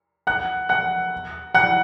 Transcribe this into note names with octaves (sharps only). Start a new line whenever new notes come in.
F#5 F#6
F#5 F#6
F#5 F#6